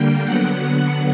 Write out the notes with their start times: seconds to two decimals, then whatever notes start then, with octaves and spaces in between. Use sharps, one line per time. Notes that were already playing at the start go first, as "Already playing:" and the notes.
Already playing: D3 G3 A#3 G5
0.24 D3 F#3 B3 F#5